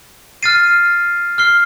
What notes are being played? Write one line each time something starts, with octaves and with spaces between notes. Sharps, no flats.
F6 A6 C7 D#7
F6 C7 G7